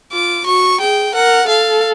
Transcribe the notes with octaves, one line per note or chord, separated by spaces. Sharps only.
F4 D6
F#4 C#6
G#4 G5
A#4 F#5
A4 F5